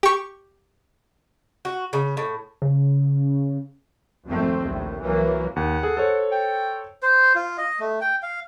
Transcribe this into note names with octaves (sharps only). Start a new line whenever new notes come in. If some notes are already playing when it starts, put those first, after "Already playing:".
G4 C#6
F#4
C#3
A2
C#3
G#1 F2 A3 C4
A#1 D#2 A2
C2 E3 F#3 A#3
D#2 F#5
G#4 A4
A4 C5 C#5
G5
C5
F4
D#5
A3
G5
F5